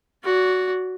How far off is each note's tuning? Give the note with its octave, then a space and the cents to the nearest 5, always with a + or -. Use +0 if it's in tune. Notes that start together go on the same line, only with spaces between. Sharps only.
F#4 +0 D5 -30